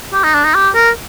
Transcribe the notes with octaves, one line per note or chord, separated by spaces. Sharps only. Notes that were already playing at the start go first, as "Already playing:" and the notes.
G4
D#4
D4
D#4
G4
A#4